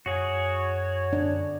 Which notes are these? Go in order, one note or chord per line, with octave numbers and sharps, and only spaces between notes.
F#2 F#4 G#4 C#5
D4